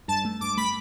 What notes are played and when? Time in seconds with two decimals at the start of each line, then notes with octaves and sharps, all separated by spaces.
0.08 G2 A5
0.25 A3
0.41 G2 D6
0.57 A3 B5